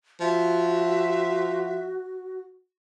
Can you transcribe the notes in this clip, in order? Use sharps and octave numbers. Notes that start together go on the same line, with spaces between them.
F3 F#4 E5